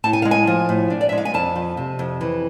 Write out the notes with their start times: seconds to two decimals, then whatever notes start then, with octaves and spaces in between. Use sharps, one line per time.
0.04 A2 A5
0.13 G#5
0.22 G#3 F5
0.31 G#5
0.47 F3
0.69 A2
0.90 D4
1.01 D5
1.09 E5
1.12 G#3
1.18 F5
1.25 G#5
1.34 F2 A5
1.56 F3
1.77 C3
1.99 F2
2.21 E3